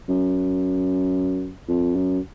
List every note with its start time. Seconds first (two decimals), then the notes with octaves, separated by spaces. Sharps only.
0.09 F#2
1.68 F2
1.96 F#2